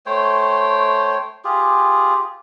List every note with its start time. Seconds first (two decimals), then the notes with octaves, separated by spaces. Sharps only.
0.06 A3 C5 C#5 G5
1.45 F4 G4 G#4